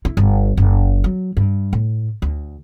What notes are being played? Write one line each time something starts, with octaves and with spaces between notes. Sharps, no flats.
E4
G1
F#1
F#3
G2
A2
D2